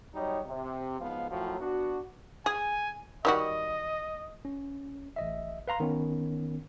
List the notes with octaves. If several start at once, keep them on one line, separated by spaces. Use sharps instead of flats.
F#3 G3 D#4 C#5 D#5
C3
B1 G#2 F3 B3 F5
F#2 A2 F3 F#3
B3 D4 F#4
G#4 G#5
D#3 G3 F#4 D#5
C#4
A1 D#5 E5
B4 F5 A#5 C6
D#3 B3 C#4